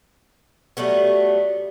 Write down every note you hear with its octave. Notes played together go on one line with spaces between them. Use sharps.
F#3 G3 A3 B3